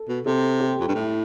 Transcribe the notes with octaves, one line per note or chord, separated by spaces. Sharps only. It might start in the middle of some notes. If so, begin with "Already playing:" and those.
Already playing: A4
B2
C3 A4
G4
F2
G2
A2 E4